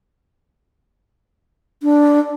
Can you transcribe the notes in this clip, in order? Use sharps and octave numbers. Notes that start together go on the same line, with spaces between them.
D4